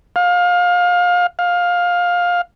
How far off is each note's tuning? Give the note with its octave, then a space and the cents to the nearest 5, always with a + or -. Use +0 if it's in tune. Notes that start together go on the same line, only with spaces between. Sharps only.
F5 +25
F5 +15